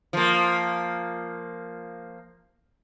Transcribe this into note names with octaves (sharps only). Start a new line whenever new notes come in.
F3 A#3